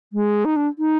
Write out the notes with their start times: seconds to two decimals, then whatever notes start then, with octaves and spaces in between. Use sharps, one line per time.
0.13 G#3
0.45 D#4
0.56 D4
0.78 D#4